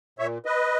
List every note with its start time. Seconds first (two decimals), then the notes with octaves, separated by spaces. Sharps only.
0.19 A#2 C#5 E5
0.45 B4 D#5